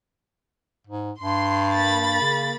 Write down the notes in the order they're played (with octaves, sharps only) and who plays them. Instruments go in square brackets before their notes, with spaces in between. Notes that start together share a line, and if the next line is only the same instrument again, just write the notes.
[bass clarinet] G#2
[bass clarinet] G2 [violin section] C6
[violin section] A#3 B5 A6
[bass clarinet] C#3